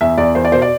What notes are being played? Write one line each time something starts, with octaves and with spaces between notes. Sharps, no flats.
E2 E5
E2 D5
E2 C5
D5
B2 C5
D5